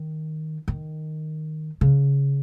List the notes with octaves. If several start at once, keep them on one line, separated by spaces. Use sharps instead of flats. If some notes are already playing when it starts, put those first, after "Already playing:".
Already playing: D#3
D#3
C#3